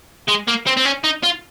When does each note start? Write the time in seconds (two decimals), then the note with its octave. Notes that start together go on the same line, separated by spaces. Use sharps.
0.29 G#3
0.48 A#3
0.67 C4
0.77 C4
0.85 C#4
1.04 D#4
1.23 F4